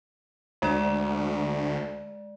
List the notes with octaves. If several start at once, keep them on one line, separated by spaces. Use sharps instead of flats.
D2 G#3 D5